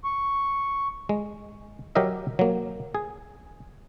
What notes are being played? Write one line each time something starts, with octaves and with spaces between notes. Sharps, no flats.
C#6
G#3
F#3 G4 A#4 D#5 E5
F#3 A#3
G#4